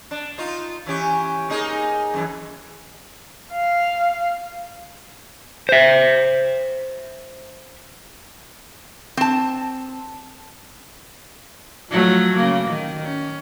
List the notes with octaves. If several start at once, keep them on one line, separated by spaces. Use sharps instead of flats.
D4
D#4 F4
E3 C#4 G4
A#3 D#4 G#4
F#2 E3
F5
C5 E5
C4 A5
F3 F#3 A3
C#3 A#3
D#3
C#4